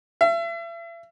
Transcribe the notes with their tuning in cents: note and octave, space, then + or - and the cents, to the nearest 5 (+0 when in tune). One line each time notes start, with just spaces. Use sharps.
E5 +40